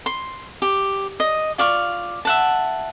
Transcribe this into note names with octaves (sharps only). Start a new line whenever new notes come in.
C6
G4
D#5
F4 D5 F5 C#6
E5 F#5 A5